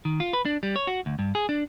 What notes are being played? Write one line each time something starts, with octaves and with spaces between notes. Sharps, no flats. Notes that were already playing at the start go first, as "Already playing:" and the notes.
D#3
F4
B4
D4
G3
C#5
F#4
D2
G2
G#4
D4